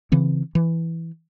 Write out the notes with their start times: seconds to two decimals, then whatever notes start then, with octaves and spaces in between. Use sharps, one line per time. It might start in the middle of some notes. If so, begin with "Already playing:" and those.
0.12 C#3 E3 C4
0.55 E3